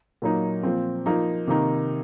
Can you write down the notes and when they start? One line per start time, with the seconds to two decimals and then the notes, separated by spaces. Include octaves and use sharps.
0.22 A#2 F#3 A#3 D#4
0.63 A#2 F3 C4
1.06 F3 A#3 D#4
1.47 C3 D#3 A#3 D#4